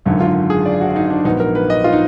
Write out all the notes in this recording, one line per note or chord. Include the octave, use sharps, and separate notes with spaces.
G#1 F#2 D3
F4
G#4
D5
F#4
D#4
D4
A#1 G#2 F#3 B3 D#4
A#4
B4
D#5
F4
D#4